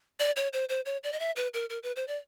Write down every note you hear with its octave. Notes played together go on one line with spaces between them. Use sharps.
D5
C#5
C5
C5
C#5
D5
D#5
E5
B4
A#4
A#4
B4
C5
D5